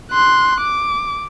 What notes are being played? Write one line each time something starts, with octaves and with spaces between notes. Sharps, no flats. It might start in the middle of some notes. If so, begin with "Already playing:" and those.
C6 F#6
D6